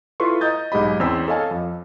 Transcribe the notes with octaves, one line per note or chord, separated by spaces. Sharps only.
E4 F4 A4 B4 C6 C#6
D#5 A#5 D#6 G6 A6
B1 G#2 G#3 G4 D#5 B5
E2 C4 C#4 C5 E6 B6
A4 C#5 D#5 F5 G#5 A5
F2